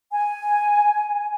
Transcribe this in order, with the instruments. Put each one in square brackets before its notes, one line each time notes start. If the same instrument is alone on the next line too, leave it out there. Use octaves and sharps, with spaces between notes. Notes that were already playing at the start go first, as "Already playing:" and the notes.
[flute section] G#5